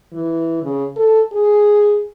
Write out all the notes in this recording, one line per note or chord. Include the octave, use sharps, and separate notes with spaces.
E3
C#3
A4
G#4